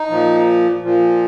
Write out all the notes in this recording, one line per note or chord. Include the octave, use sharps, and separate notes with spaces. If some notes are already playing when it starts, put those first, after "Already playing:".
Already playing: D#4
A#2 F3
A#2 F3